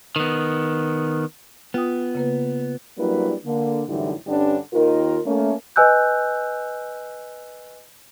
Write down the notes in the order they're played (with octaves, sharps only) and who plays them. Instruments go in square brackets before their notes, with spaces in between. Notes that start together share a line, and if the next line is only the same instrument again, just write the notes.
[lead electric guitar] D#3 B3
[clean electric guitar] B3 [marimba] F4 G5 D#6
[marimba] C#3 A#3 B4
[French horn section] F#3 G3 A#3 D4 E4 B4
D3 A#3
F#2 A2 D3 E3 G3 D#4
G2 D3 G3 C#4 D4
D#2 D#3 F4 A#4
A3 A#3 C#4
[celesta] B4 D#5 G#5 E6 F#6 G6